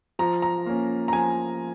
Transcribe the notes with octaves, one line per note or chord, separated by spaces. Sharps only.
F3 A#5
A#5
A#3 C#4
A#5
F3 G#5